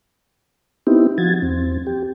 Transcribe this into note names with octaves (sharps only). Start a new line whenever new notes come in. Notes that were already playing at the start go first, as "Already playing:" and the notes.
B3 C4 D#4 E4 G4
F3 F#4 G#6 A6
E2 C4
G4